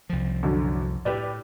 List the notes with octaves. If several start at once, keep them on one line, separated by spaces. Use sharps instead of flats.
C2 F3
F#2 D3
A2 G4 B4 D5